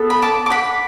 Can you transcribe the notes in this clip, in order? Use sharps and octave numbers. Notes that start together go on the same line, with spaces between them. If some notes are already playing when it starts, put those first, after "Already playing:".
Already playing: B3 A4
B5
A5 D6
D6
F#5 B5